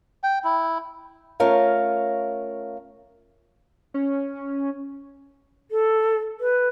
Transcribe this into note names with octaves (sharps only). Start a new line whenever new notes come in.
G5
E4
A3 C#4 F4 A#4 C#5 F5
C#4
A4
B4